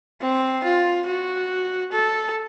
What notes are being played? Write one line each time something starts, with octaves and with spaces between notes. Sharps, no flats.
C4
F4
F#4
A4